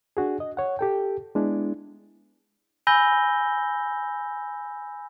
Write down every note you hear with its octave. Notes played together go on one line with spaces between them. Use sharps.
D4 F#4 G#4
D#5
C#5 F#5
G4 A4 G5
G#3 B3 D4 E4
G#5 B5 E6 G6 A#6 G7